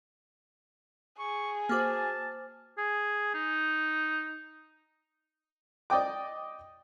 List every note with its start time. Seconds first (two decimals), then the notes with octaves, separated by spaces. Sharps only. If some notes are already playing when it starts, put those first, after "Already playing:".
1.19 G#4 C#6
1.69 A#3 F#4 C5 A5 D6 F6
2.78 G#4
3.34 D#4
5.90 D5 D#5 G5 D6